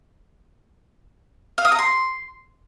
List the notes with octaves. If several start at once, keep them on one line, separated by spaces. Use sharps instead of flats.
F5
D#6
A#5
C6